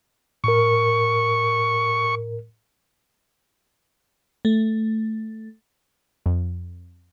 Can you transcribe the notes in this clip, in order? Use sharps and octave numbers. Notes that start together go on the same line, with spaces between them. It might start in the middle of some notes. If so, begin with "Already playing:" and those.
A2 A#4 C#6
A3
F2